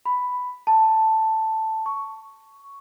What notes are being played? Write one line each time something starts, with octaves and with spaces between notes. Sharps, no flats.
B5
A5
C#6